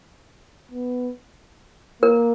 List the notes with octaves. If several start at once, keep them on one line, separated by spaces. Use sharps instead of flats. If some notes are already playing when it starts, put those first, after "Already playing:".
B3
A#3 A#4